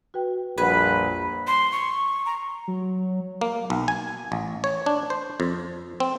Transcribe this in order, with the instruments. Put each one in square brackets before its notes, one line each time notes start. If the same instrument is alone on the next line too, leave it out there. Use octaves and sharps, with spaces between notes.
[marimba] F#4 B4 G5
[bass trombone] A#1 [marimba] F2 G3 F#5 [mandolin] B4
[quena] C6
C#6
A#5
[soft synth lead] F#3
[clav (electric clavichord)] A#3
B1
G#5
A1
C#5
D4
C5
F2
C4